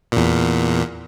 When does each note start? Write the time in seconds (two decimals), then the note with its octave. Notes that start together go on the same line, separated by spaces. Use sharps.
0.12 E2 A#2